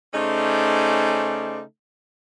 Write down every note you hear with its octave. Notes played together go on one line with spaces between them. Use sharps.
C#3 A3 C#4 D#4 C5 D5